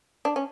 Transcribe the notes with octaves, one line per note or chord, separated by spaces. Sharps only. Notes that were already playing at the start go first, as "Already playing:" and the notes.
D4
C#4